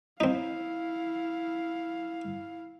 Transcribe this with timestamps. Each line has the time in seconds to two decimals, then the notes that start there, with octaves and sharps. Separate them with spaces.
0.20 C4 D#4 E4 F5